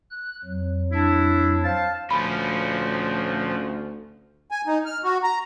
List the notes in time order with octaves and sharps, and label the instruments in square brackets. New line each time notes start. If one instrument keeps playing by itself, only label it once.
[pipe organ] F#6
F2 F#3
[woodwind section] D4 E4
C5 F5 A5
[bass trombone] D2 [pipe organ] A#2 F3 [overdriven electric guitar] C#4 F4 [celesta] B5
[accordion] G#5
D#4
F6
F#4
A#5